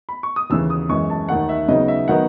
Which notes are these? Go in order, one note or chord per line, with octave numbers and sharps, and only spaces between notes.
B5
C#6
D#6
D#2 C#3 E3 E6
D#6
F#2 E3 G#3 C#6
A5
D#2 D#3 A3 F#5
E5
C#3 F#3 B3 D#4 D#5
E5
D#3 F#3 B3 D#4 F#5